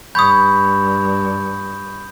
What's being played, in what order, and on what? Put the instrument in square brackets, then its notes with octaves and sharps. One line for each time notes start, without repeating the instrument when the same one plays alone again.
[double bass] G2 [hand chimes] B5 C#6 G#6 [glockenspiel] D#6 G6